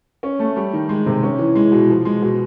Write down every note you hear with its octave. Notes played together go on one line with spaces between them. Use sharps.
C#4
A3
G3
D#3
G#3
C3
C#4
E3
G#3
B2
F3
G#3
B2